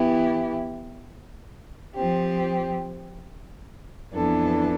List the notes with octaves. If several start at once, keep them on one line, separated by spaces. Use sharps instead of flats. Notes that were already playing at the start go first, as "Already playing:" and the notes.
Already playing: E3 B3 E4 G4
F3 C4 G4
F2 E3 B3 D4 A4